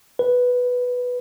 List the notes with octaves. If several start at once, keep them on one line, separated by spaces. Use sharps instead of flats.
B4